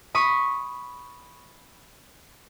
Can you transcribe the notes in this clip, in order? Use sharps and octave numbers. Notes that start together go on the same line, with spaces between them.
B5 C#6 D#6